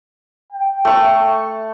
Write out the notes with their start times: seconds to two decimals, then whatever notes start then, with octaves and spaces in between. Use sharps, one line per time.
0.52 G5
0.85 A3 C#6